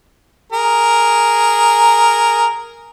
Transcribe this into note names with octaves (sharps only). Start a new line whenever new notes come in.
G#4 A#4